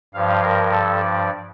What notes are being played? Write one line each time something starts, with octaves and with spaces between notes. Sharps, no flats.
G2 F3 F5
A#4
A4
D5